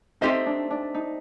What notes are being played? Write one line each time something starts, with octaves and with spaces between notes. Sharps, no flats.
A3 C4 D#4 G4 C5 D#5
D4
D4
D#4